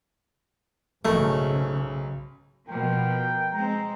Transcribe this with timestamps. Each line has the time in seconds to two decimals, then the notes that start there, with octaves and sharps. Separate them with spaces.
1.05 B1 G#2 C#3 A3 A#4 C#6
2.69 B2 F3 A#4 G5
3.53 G#3 C4 A#5